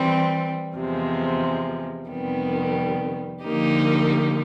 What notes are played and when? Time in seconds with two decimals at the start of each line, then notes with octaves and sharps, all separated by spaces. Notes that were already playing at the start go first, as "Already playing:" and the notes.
Already playing: E3 G3 C4
0.75 E2 C3 F3 G#3
2.09 F2 C3 D#3 G3 B3
3.44 D3 F3 A#3 D#4 G4